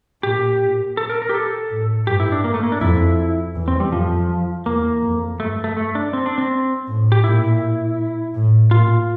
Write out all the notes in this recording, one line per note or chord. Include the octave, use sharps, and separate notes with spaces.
A#2 G4
A4
A#4
A#4
G4
A4
A2
G2 G4
E4
D4
A#3
A3
A#3
D4
F2 E4
E2
C4
G3
F2 F3
E2 A#3
F2
G2 A3
A3
A3
D4
C4
D4
C4
A2
G4
A#2 E4
A2
A#2 F4